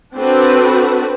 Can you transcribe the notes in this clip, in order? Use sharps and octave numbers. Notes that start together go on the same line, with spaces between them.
C4 D4 F#4 A4 B4